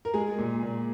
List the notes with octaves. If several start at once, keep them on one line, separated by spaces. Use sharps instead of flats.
A#4
G#3 G#4
A#2
A#2